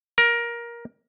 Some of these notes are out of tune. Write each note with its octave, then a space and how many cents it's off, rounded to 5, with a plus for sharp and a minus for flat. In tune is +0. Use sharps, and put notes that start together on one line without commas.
A#4 +15